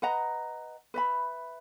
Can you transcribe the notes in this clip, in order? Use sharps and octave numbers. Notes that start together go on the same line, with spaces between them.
B4 D#5 F#5 A#5
B4 E5 B5